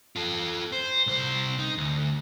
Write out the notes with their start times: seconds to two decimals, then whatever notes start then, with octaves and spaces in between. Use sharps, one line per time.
0.16 F4 A4
0.72 C5
1.07 C2 C5
1.59 D#4
1.78 D2